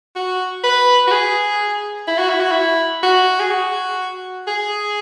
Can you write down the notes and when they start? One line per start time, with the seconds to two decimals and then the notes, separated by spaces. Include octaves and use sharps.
0.16 F#4
0.64 B4
1.07 F#4
1.11 G#4
2.08 E4
2.19 F#4
2.30 E4
2.40 F#4
2.52 E4
3.03 F#4
3.40 G#4
3.51 F#4
4.47 G#4